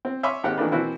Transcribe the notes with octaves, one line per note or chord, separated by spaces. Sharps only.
C4
C#5 E5 G#5 B5 C6 D6
D#2 G#2 C4 G4 F5 F#5
D#3 E3 A3 A#3 D4 B4
B2 E3 A#3 C4 E4 F#4